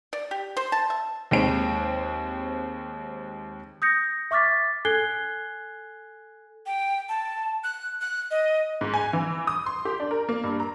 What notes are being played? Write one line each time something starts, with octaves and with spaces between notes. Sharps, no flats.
D5
G4
C5
A5
E5
D#2 G#3 C4 D7
D#6 G6 A#6 C#7
E5 C#6 D6 F6 A6 B6
A4 G#5 F#6 G#6 C7 G7
G5
A5
F#6
F#6
D#5
G#2
G#5
E3
D#6
C6
G4
D4
A#4
A#3
G2
A#5